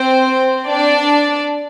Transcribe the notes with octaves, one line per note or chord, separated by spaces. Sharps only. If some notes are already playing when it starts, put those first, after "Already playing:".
Already playing: C4 C5
D4 D5